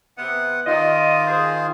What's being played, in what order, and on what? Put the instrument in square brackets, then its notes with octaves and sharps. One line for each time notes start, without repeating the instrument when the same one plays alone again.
[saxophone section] C3 B3 [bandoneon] F#5
[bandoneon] D#3 F4 [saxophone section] G4 D5 D#5
[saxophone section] G#4 C5